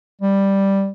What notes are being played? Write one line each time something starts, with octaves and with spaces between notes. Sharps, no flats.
G3